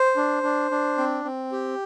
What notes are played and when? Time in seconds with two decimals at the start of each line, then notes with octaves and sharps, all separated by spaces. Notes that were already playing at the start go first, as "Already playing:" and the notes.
Already playing: C5
0.17 D4
0.43 D4
0.71 D4
0.98 C4
1.24 C4
1.52 G4